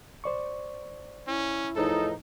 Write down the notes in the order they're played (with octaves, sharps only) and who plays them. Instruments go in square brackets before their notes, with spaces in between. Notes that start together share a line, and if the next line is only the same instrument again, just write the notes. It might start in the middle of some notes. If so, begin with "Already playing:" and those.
[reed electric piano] C5 D5 C#6
[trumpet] C#4 [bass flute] E4
[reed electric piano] E2 G#4 B4 [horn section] A2 F3 D#4 [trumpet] A4